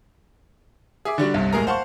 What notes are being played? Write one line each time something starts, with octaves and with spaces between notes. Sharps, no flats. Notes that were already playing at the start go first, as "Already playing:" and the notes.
G#4 E5 D6
D3 G3 D4 F#4
G1 C2 G2
D#1 A2 G#3 G#4 A#4 A#5
C5 F5 F#5 A5 C6 C#6